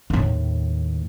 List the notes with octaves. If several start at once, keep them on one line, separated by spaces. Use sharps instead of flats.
D#2 A2